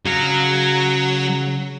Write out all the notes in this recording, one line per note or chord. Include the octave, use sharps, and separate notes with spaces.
C#3 F#3 G#4 F5